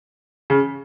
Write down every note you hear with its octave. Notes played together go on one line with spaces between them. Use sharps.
C#3